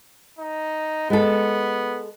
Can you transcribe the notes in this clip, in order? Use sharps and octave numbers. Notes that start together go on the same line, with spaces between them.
D#4
G#3 B3 A4